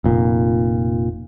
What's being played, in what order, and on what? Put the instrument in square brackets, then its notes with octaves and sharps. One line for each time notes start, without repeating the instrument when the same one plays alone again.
[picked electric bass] F1 A#2